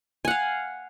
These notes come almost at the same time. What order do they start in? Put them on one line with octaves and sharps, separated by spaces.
G#5 F#5 F5